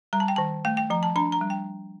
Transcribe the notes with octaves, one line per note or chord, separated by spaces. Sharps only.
G3 A#5
A5
G5
D#3 A5
A3 G5
G5
F3 A#5
A5
D4 A#5
A#5
G3
G5